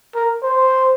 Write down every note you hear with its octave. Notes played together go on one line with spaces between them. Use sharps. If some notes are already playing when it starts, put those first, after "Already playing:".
A#4
C5